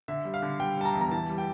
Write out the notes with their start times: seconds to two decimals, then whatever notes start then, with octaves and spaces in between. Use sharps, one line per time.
0.08 D3 E5
0.25 G3
0.34 F5
0.42 D3
0.60 G3 G5
0.78 G3 A5
0.85 A#5
0.95 E2
1.01 A#5
1.11 E3 A5
1.29 G3
1.38 G5